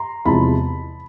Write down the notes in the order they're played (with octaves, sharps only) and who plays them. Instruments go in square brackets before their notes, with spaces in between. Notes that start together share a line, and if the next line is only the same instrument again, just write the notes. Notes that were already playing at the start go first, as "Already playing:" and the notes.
Already playing: [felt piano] A#5 C6
E2 C3 F3 G#3 A5 B5